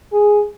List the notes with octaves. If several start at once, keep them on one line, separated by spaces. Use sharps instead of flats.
G#4